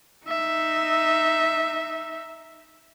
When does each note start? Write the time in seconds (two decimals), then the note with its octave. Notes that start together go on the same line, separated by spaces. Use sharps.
0.28 D#4 E5